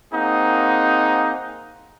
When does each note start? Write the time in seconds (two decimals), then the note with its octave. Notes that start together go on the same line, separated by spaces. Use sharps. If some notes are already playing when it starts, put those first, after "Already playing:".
0.13 A#3 C4 D#4 G#4 F#5